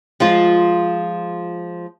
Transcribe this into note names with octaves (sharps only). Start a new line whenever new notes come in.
F3 G#3 F4